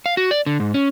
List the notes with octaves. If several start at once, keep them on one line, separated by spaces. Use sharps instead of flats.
F5
F#4
D5
D3
G#2
C#4